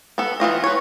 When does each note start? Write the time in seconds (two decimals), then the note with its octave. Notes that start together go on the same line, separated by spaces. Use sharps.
0.18 B3 A4
0.40 E3 C#4 F4 D#5
0.64 B4 C#5